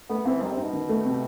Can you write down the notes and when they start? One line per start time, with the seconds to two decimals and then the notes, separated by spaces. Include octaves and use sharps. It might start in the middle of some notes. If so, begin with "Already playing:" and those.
0.09 A3 B3
0.26 E3 C4
0.42 D#3 G3
0.52 C3 D#4
0.63 B2
0.73 D#3
0.89 A3
1.05 C3